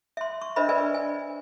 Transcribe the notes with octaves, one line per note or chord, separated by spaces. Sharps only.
E5 C6
C#6
D4 A#4 C5 D#5 E5 B5
A#4 B4 D5 E5 G#5
G#5